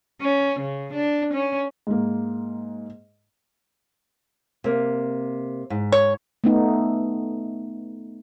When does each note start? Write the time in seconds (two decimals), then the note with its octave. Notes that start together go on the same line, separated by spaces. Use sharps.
0.21 C#4
0.60 C#3
0.93 D4
1.33 C#4
1.87 G#2 A#3
4.64 C3 A#3
5.70 G#2
5.92 C#5
6.44 A3 B3 D#4